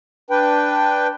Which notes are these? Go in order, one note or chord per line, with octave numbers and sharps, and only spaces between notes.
D4 B4 G5